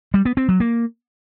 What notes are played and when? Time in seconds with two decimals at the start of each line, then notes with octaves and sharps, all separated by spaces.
0.14 G3
0.25 B3
0.37 C4
0.49 F#3
0.60 A#3